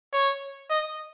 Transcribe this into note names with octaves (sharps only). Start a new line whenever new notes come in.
C#5
D#5